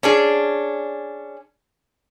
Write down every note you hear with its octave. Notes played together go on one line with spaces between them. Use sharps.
C#4 D4 G#4